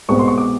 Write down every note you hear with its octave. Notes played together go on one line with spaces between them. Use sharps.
C2 B2 G#3 C4 C#6
C6
C#6
D6